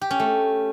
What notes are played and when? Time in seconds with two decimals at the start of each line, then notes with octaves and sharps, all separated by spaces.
0.01 G4
0.11 C#4
0.20 A3